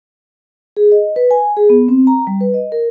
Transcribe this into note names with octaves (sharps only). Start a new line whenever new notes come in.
G#4
D#5
B4
G#5
G#4
B3
C4
A#5
G3
B4
D#5
A#4